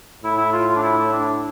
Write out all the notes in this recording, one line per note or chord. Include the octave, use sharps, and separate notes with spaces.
A2 E4
E4
F4
F4
D4
E4
D4